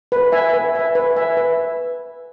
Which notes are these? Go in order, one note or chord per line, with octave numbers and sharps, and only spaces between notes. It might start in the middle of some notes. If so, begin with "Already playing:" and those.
B4
E5 G#5
B4
E5 G#5
B4
E5 G#5
B4